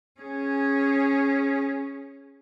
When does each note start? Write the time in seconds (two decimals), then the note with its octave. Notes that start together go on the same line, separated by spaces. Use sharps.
0.21 C#4 G#4